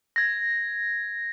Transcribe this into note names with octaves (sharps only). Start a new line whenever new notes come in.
G#6 A#6